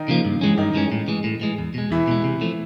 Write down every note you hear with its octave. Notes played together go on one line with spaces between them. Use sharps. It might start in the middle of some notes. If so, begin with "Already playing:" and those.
Already playing: D#3 D#4
C#3 F3 A#3
G2
E3 G#3 C#4
G2 D#3 D#4
E3 G#3 C#4
A2
E3 G#3
A2
E3 G#3
E2
B2 G#3
E2 E3 E4
B2 G#3
C3
F3 A3